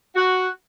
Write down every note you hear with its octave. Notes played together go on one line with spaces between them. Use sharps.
F#4